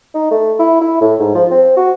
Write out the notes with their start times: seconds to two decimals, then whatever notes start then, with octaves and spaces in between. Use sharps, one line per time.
0.14 D#4
0.31 A3
0.59 E4
0.81 E4
1.01 A2
1.20 G#2
1.35 F3
1.51 C4
1.77 F#4